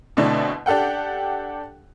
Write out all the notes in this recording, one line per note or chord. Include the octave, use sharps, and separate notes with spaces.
B2 D3 A3 C4 D4 E4
D4 G4 A4 F#5 G5